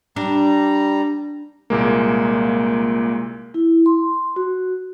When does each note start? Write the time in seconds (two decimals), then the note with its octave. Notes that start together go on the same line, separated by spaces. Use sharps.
0.16 G3 D4 A#5
1.70 C2 A#2 G#3 A#3
3.54 E4
3.86 C6
4.36 F#4